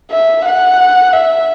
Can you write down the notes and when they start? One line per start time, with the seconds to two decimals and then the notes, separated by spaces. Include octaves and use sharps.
0.11 E5
0.45 F#5
1.13 E5